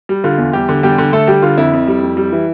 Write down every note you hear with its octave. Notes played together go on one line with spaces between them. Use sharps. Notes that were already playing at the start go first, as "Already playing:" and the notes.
G3
D3 F4
E2
E2 G3 G4
D3
E2 G3 G4
D3
D3 A3 A4
G3 G4
D3 F4
F2 E4
F2
G3
F2
G3
E3